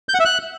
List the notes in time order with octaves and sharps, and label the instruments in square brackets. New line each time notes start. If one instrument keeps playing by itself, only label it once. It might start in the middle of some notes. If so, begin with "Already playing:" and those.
[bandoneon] G6
F#5
E5
F#6